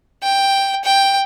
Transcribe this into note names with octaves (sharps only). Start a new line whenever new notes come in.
G5
G5